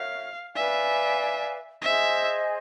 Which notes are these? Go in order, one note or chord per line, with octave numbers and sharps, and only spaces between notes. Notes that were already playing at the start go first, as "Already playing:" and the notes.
Already playing: F#4 A#4 C#5 E5 F5
B4 D5 E5 F5 G#5
G#4 C5 D#5 E5 G#5